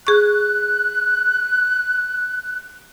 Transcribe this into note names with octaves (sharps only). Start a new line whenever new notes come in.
G#4 C#6 F#6